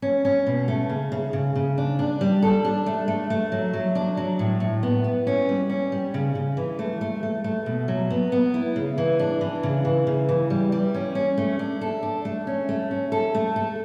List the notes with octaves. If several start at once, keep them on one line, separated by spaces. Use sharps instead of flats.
C#4
C#4
B2
A3
C#3
C#3
C#3
C#3
D4
D4
G3
A4
D4
A3
A3
A3
F#3
F#3
D4
F#3
A2
A2
B3
B3
C#4
G3
C#4
G3
C#3
C#3
E3
A3
A3
A3
A3
B2
F#3
B3
B3
E4
C#3
E3
D4
E3
C#3
E3
C#3
E3
G3
G3
C#4
C#4
A3
D4
A4
D4
A3
C#4
A3
C#4
A4
A3
A4